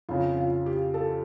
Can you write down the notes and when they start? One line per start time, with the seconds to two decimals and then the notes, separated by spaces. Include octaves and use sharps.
0.09 F2 C#3 F3 F4
0.37 F4
0.66 G4
0.94 A4